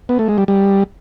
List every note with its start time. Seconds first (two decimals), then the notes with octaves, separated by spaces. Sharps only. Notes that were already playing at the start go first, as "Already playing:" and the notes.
0.09 B3
0.19 A3
0.28 G#3
0.38 G3
0.48 G3